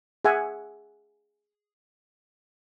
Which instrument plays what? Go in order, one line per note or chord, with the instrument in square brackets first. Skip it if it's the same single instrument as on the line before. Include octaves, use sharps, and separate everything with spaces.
[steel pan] G#4 E5 F#5 G#5